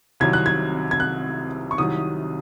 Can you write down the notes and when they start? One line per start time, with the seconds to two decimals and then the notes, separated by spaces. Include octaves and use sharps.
0.20 C2 C3 D#3 F#3 G#6
0.33 F#6
0.46 G#6
0.91 G#6
1.00 F#6
1.71 C#6
1.78 C2 C3 D#3 F#3 D#6